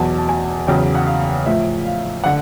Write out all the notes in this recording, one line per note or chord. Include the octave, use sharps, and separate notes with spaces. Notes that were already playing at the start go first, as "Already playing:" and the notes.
Already playing: E2 B2 F#3 A5
A5
G#5
E2 C#3 F#3 G5
F#5
F5
A2 F3 E5
F5
D3 F#5